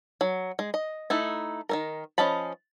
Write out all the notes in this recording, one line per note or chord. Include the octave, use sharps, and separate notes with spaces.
F#3
G#3
D#5
A3 D#4 E4
D#3 A3 A#4
F3 C#4 D#5 A5 B5